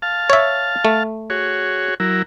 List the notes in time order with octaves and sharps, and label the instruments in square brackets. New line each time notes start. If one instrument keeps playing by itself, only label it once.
[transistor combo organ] F5 A5
[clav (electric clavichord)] C#5 E5
A3
[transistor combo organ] F#4 G#4 C#5
F#3 E4 A#4